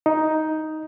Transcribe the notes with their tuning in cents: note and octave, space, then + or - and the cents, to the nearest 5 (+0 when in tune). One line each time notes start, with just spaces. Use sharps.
D#4 +5